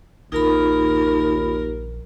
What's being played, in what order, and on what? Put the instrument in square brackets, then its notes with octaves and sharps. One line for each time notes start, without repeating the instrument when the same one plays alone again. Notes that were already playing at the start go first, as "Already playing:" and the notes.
[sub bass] A#1 [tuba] D#2 [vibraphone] D#4 F4 B5 [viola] A#4